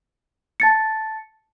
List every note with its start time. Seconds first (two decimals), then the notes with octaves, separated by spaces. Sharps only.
0.60 A5 A6 C#7